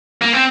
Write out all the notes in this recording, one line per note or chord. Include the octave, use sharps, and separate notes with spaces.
A#3
C4